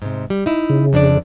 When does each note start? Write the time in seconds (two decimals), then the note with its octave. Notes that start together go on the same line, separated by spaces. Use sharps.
0.02 G#2 C3
0.30 G3
0.46 D#4 E4
0.70 C#3
0.93 F2 D4 D5